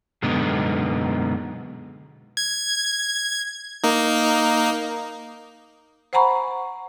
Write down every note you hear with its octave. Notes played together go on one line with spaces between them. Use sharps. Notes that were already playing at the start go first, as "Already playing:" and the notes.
F#2 B2 D3 G#3 B3 D#4
G#6
A#3 D#4
C5 F#5 G#5 A#5 B5 C#6